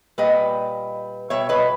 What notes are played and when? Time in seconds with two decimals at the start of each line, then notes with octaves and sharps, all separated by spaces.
0.18 A#2 G3 B4 D#5
1.30 B2 G3 C#5 E5
1.49 B4 D#5